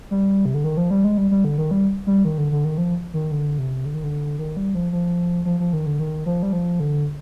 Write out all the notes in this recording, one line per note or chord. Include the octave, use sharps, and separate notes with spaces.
G3
C3
D3
D#3
F3
G3
G#3
G3
G3
D3
D#3
G3
G3
D#3
D3
D3
D#3
F3
D#3
D3
C3
D3
D#3
D3
D#3
G3
F3
F3
F3
F3
D#3
D3
D#3
F3
G3
F3
D3